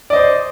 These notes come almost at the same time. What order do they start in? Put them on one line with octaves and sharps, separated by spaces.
D5 D#5 C5